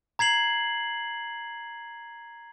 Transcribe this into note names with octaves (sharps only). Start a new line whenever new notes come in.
A#5 G#6 C7 F#7